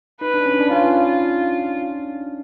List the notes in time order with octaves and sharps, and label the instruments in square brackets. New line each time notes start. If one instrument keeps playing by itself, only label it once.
[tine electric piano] D#4 [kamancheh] B4
[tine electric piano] D4
C#4
D4
[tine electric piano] C#4 [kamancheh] F4